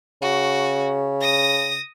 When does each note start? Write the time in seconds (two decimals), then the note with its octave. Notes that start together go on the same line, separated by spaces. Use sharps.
0.22 C#3 F#4
1.21 D#6 A#6